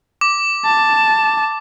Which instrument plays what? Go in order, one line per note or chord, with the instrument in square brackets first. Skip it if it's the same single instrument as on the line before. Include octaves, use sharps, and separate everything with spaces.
[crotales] D6
[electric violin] A5